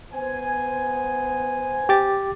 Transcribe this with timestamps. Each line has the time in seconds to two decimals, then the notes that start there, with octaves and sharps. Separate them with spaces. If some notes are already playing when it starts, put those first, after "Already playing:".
0.13 B3 C5 G#5
1.89 G4 D6 A6